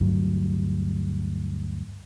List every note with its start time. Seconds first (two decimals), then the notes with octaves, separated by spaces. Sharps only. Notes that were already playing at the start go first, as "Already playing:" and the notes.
0.01 D2 G2 F#3